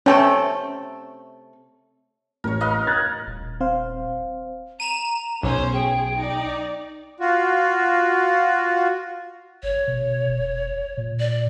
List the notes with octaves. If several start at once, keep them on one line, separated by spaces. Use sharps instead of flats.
C3 A3 C#4 A4 C#5 G5 A5 C#6
A1 A#4 C#5
A#4 D#5 F5
F#6 G#6 A6
D#1
C4 C5 F5
A#5 D#7 E7
B1 C#4 C5 C#5
G#4 G5
D#4 D5
F4 F#4
G1 C#5
B2
F1
A#2
D5